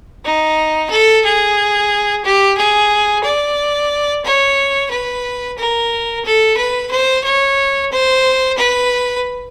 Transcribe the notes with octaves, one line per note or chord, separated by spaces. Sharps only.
D#4
A4
G#4
G4
G#4
D5
C#5
B4
A#4
A4
B4
C5
C#5
C5
B4